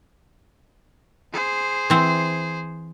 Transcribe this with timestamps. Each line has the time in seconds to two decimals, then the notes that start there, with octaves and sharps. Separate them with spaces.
1.33 G#4 C5
1.90 E3 C4